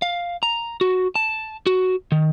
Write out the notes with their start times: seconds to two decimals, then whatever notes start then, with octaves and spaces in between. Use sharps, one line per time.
0.02 F5
0.43 A#5
0.81 F#4
1.15 A5
1.66 F#4
2.12 D#3